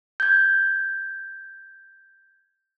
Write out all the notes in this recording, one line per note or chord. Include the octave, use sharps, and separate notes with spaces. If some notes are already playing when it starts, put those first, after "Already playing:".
G6 G#6